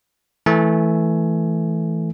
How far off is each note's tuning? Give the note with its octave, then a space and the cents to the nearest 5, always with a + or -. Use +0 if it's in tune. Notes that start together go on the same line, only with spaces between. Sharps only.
E3 +0 A3 +0 G#5 +15